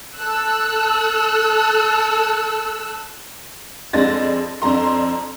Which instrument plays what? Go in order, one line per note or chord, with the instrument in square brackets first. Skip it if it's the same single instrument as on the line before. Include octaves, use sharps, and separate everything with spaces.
[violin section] A4 E6 F#6
[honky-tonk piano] F2 G#3 D4 A6 A#6
F2 D4 A#5 C6